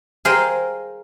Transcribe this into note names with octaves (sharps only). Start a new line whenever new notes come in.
G#4 A#4 C5 D#5 F5 G5